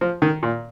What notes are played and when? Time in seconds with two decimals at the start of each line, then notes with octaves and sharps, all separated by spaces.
0.01 F3
0.22 D#3
0.43 A#2